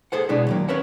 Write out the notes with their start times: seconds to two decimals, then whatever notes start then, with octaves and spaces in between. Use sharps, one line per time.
0.12 G#4 A4 C5 F#5
0.29 B2 G#3 B3 D4 E4
0.47 D#2 F#3 A#3
0.68 C#4 A#4 B4 C#5 E5 F#5